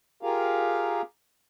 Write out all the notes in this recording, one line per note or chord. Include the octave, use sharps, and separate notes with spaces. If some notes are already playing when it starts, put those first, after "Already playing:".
F4 G4 G#4 A#4 F5